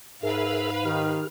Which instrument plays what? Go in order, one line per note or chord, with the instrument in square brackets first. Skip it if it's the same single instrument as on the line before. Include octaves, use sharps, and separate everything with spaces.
[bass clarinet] G#2 [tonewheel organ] G#4 A#4 E5 [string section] B4 F5
[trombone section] D#3 [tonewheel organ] G4 F6